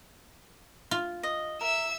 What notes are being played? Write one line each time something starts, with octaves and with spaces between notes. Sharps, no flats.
F4
D#5
A#4 E5 E6